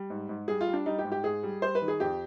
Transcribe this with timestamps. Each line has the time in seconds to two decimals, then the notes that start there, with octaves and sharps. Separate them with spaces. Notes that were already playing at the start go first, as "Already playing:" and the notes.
Already playing: G3
0.10 G#2
0.29 G#2
0.48 G3 G#4
0.61 F4
0.67 G3
0.73 D4
0.86 G3 D#4
0.99 G4
1.04 G#2
1.12 G4
1.24 G#2 G#4
1.43 G3
1.62 G3 C5
1.75 B4
1.82 D#3
1.88 G#4
2.00 F2 G4